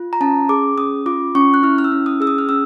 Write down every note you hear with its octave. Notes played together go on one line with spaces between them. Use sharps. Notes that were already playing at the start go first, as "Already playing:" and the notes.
Already playing: F4
A#5
C#4 A5
G#4 D6
C#4 D#6
F4 D6
C#4 C#6
F#6
E4 F6
F6
E6
C#4
D#6
G#4 E6
D#6
F6
C#4 E6